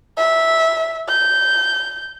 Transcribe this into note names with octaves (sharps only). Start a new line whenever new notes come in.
E5
G6